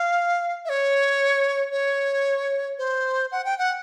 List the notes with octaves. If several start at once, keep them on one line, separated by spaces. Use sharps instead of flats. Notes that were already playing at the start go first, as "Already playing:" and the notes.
Already playing: F5
E5
C#5
C#5
C5
F#5
G5
F#5